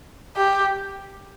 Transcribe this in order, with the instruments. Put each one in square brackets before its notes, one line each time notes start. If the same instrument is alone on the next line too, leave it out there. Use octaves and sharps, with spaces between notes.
[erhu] G4